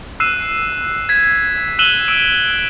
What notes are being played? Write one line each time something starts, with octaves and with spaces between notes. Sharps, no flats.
E6 F#6 C7 D#7 E7
G#6 B6
E6 F#6 D#7 E7 F#7 G7
E6 D7